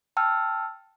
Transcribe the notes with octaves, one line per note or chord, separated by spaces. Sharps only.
G5 A5 E6 F6